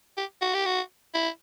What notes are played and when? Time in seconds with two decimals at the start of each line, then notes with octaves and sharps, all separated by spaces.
0.17 G4
0.42 F#4
0.54 G4
0.66 F#4
1.14 E4